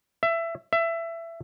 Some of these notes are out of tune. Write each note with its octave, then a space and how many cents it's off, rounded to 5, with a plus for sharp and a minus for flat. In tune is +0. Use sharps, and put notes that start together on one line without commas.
E5 +20
E5 +20